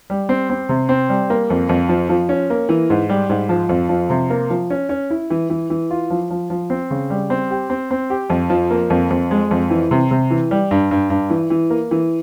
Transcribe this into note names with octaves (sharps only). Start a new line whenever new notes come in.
G3
C4
C4
C3
C4
G3
A#3
F2
F2
F3
F3
C#4
A#3
E3
G#2
G3
G#2
F3
F2
F3
C3
A#3
F3
C#4
C#4
E4
E3
E3
E3
F4
F3
F3
F3
C4
C#3
G3
C4
G4
C4
C4
G4
F2
F3
A#3
F2
F2
G#3
F2
E3
C3
C3
E3
G3
G2
G2
G2
E3
E3
A#3
E3